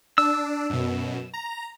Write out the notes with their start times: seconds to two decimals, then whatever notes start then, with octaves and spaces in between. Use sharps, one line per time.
0.18 D4 E6
0.70 F#2 B2
1.34 A#5